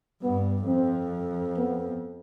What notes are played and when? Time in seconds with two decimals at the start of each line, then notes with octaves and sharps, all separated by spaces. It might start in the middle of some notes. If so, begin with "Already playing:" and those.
0.22 G2 B3
0.67 F2 C4
1.57 B3